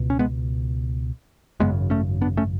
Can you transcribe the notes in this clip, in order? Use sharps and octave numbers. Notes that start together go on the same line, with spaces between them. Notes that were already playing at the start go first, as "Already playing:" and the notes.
Already playing: C#2 B2
C#4
G#3 B3
G#1 F#2 C#3 G#3 B3
A3 C#4
B3 D4
A3 C#4